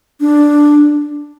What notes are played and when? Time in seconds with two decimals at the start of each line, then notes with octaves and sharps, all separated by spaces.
0.20 D4